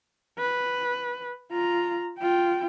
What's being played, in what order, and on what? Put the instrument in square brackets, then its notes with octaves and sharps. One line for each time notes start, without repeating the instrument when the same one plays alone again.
[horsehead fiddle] B4
F4 A#5
F4 G5